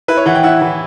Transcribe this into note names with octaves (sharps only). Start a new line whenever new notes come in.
E4 B4
C#5
E3 F#5
G5
E4 F#5
E3